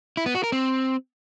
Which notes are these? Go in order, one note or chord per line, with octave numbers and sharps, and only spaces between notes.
E4
B3
F#4
A#4
C4